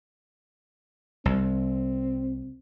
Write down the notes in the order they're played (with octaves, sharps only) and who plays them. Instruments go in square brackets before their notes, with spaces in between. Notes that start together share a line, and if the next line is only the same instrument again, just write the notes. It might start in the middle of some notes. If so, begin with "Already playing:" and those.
[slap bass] C2 [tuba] C4